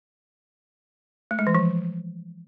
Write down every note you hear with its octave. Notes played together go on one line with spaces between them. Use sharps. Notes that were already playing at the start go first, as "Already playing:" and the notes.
A3
G#3
E3
F3